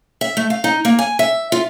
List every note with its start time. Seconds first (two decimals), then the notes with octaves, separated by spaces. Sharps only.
0.21 E5
0.37 A3
0.50 F5
0.64 D#4
0.85 A#3
0.99 G#5
1.19 E5
1.52 F4